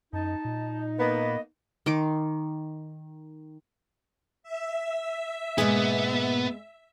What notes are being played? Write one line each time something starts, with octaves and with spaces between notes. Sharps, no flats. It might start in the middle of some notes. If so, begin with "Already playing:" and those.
F#2 D#4 A5
A#2
A#3 B3 D#5
D#3 C6 D6
E5
G#2 B2 G#3 A#3 B3 G#4